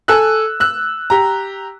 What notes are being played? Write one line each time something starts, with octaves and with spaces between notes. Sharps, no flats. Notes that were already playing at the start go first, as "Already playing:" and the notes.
A4 G#5 E6 F#6
E6 F#6
G4 A#5